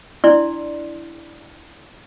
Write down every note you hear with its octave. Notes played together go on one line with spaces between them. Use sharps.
D4 E4 D5 C6